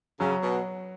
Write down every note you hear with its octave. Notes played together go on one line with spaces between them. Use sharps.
C#3 F#3
B2